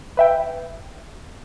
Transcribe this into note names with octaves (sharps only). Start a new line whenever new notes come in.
B4 E5 G5